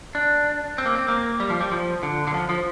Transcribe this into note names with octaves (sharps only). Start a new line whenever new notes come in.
D4
C4
A#3
C4
A#3
G3
F3
G3
F3
D3
D3
F3
F3